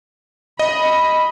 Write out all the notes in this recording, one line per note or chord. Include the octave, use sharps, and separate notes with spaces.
D#5 B5